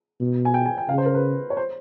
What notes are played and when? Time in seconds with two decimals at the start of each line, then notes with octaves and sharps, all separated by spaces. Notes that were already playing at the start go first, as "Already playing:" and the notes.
0.20 B2
0.45 G#5
0.54 G5
0.66 G#5
0.78 G5
0.89 C#3 F5
0.98 C5
1.06 A#4
1.14 B4
1.50 C#5
1.57 C5